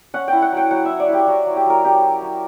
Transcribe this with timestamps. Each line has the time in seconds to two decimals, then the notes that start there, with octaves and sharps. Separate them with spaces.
0.14 C#4 F#5
0.28 E4 G5
0.42 F#5
0.52 F#3 G5
0.71 F#3 F#5
0.85 E4 E5
1.00 D5
1.08 E4
1.13 G4
1.27 F#3 F#4
1.47 F#3
1.56 G4
1.66 F#3 A#4
1.84 C#4 G4
2.03 F#3
2.22 F#3